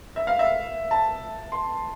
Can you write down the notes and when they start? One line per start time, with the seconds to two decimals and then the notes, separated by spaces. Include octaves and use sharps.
0.16 E5
0.27 F5
0.39 E5
0.91 A5
1.52 C6